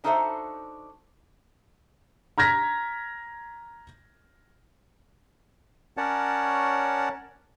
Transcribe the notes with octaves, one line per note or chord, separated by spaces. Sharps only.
D4 D#4 F#4 A4 C5 E5
A#5 F6 G#6 A#6 B6
C#4 A#4 C#5 D5 F#5 A5